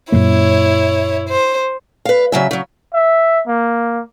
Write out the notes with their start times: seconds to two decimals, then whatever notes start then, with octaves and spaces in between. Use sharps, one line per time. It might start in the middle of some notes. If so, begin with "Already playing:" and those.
0.12 F#2 A#2 A#3 E4 C#5
1.29 C5
2.05 B4 F5
2.32 C#3 F#3 E5
2.51 C#3 F#3
2.94 E5
3.47 A#3